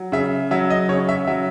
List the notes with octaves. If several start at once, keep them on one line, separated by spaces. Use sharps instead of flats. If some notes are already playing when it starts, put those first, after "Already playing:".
Already playing: F#3
C#3 E5
F#3 E5
D#5
C#3 C#5
E5
F#3 E5